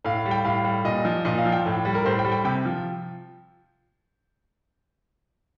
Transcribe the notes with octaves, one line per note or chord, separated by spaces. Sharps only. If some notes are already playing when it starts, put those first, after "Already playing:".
A2 F5
F5
G3
G5
A2 F5
G3
A#2 D#5
F3
A#2 D#5
F5
F3
G5
A2
G3
A#4
A2 C5
G5
G3
G5
C3 G5
F3